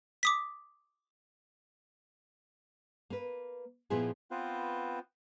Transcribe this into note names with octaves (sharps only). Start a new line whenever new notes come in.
D6 D#6 B6
A#3 B4
A#2 F3 B3 E4 G#4
B3 C4 F4 B4 C5